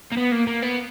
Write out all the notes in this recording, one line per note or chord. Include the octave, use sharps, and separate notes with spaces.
A#3
B3
A#3
A#3
B3